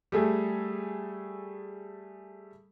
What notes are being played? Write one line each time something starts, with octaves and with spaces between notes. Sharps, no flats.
G3 A3 G#4 A4